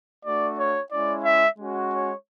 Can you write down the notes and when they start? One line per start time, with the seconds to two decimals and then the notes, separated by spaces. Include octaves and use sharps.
0.24 A3 D4 F#4 D5
0.58 C#5
0.91 G#3 C#4 E4 D5
1.25 E5
1.58 G#3 C#4 F#4
1.90 C#5